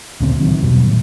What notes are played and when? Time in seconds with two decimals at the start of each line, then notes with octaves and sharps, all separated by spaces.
0.21 D2 A#2 C#3 C4
0.40 D#3 F#3
0.62 E2 G2 B2 F#3
0.87 A2